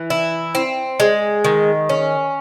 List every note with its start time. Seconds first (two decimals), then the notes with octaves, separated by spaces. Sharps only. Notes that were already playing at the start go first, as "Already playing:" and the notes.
Already playing: E3
0.10 E4
0.55 C4
1.00 G#3
1.44 D#3
1.89 C#4